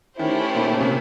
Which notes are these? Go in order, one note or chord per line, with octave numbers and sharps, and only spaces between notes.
D#3 A3 C#4 E4 G4 C5
A#2
C#3
C3